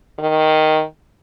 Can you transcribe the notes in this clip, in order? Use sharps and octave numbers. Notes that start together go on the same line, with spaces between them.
D#3